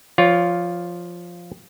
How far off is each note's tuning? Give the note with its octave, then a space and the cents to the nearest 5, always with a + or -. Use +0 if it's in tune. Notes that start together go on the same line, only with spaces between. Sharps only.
F3 +0 F4 +0 C#5 +30